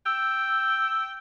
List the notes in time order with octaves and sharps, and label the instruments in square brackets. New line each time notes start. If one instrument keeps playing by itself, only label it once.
[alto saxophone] G5 [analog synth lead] E6